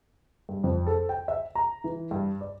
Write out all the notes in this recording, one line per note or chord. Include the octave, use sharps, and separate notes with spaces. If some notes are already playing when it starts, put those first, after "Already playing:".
G2
F2
A4
G5
E5
A#5
E3
G2
D5